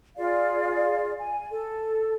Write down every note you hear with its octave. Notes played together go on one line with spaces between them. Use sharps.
F4 G#4 D5 F5
G#5
A4